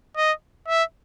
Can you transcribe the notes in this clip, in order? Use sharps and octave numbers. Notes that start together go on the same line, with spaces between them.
D#5
E5